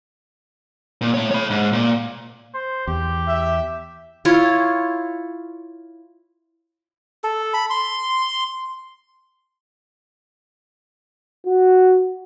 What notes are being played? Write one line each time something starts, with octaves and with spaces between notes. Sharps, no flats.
A#2
A3 C#5
C#5 B5
G#2
A#2
C5
E2 G4
E5
E4 F4 C#5
A4
B5
C6
F#4